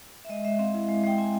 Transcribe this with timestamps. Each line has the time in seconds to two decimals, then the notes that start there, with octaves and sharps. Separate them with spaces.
0.25 E5
0.29 G#3 D#5
0.45 G#3 E5
0.59 C4 F5
0.74 E4
0.89 G#3
1.03 G#3 G5
1.18 C4 G#5